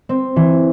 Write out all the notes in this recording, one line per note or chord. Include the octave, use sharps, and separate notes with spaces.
C4
E3